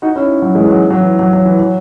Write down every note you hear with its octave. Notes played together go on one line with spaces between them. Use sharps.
D#4 F#4
C#4 E4
F#3
E3 G#3
F#3
F#3
E3
F#3
F#3
E3
F#3